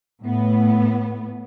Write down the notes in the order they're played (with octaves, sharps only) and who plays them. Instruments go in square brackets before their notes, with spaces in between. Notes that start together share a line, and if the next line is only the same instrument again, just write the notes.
[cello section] A2 B3